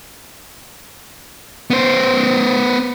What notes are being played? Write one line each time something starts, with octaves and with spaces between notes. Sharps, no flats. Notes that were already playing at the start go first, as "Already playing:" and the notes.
B3 C5